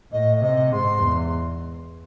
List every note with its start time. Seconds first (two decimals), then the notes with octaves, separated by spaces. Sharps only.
0.12 A2 D#5
0.42 C3 D#5
0.71 G#2 C6
1.01 E2